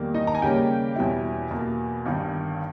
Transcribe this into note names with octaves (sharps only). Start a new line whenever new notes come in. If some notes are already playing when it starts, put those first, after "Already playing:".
Already playing: E2 D#3 G3 A#3
D#4 D#5
A#5
G#5
D#2 C#3 G3 A#3 C#4 G4 G5
E2 B2 G3 C#4 E4
E2 B2 A#3
G1 G2 D#3